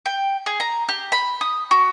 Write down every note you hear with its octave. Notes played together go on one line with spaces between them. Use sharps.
G5
G#4
A#5
G4
B5
D#6
F#4